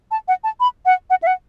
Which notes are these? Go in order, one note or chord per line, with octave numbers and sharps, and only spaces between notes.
A5
F#5
A5
B5
F#5
F#5
E5
F#5